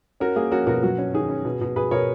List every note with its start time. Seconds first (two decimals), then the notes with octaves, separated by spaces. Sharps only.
0.20 C#4 F#4 A#4
0.36 A#3 G#4
0.51 C#4 F#4 A#4
0.67 B2 F#4 A#4
0.83 F#3 F#4
0.98 C#4
1.14 D#3 G#4
1.29 C#4
1.45 B2
1.61 B2
1.76 B2 G#4 B4
1.91 B2 A#4 C#5